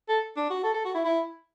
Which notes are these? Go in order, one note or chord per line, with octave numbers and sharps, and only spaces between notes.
A4
D4
F#4
A4
A4
F#4
E4
E4